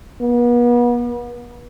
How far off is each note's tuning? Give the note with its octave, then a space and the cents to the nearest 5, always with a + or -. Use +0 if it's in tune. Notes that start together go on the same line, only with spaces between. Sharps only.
B3 -40